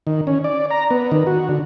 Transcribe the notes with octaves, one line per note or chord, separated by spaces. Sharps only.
D#3
C#4
D5
A#5
B3
D#3
F#4
D3